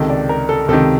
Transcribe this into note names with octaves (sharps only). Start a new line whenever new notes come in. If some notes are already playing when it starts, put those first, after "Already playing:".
Already playing: C#2 C3 D#3 A4
D5
A#4
A4
C#2 C3 D#3 A4